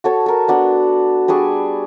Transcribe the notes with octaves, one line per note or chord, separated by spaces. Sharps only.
F#4 A4 C#5
A4 A#4
B3 D4 F#4
G3 D4 G#4 C#6